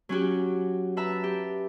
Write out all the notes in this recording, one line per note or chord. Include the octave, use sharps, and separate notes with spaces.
F#3 C#4 F#4 G4
B4 E5 A5 A#5
G4